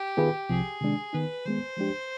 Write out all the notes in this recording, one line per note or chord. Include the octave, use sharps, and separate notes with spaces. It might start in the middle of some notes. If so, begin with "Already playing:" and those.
Already playing: G4
D#3 B3 F4 G#4 B4
C2 C3 F3 G#4
C3 D#3 G#3 D4
D#3 B3 D#4 B4
D#3 G#3 B3 C5
F3 G#3 D4 G4